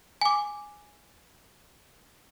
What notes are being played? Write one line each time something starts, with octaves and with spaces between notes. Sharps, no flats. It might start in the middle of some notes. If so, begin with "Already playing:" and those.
G#5 D6